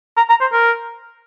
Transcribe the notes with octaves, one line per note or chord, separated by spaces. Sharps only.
A#5
A#5
C5
A#4